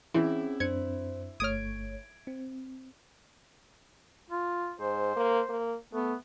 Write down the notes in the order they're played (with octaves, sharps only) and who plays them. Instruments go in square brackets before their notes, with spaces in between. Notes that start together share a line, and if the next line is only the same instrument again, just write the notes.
[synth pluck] E3 [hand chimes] C4 C#4 G#4 [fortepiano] E4
[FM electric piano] F#2 C4 D4 [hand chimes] C5 [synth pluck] G#6 C#7
[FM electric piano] G1 A3 C#5 [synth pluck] D#6 F6 [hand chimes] G#6 D7
[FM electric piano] C4
[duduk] F4
[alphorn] G#2 [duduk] C5
[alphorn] A#3
A#3
[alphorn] A3 [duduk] B3